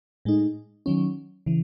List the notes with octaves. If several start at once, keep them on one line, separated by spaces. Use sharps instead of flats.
A2 G#3 D#4
D#3 F#3 C#4
C#3 E3